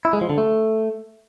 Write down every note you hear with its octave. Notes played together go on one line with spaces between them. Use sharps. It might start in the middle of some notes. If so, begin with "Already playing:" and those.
E4
G#3
F3
D3
A3